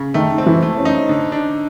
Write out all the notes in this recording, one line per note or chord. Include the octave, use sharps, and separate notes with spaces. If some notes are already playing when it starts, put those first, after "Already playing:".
Already playing: C#3
D#3 A3 D#4
C4
E3 E4
A3
C#4
D#4
D3
D4